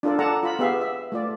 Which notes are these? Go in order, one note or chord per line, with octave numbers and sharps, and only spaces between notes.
D4 F4 A4 A#4 D5
A4 D5 F#5 A5 A#5
F4 B5
B3 G4 G#4 E5 F5
E5
A3 F4 D5